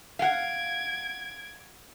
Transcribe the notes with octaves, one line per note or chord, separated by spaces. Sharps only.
F5 F#5 G#6 D7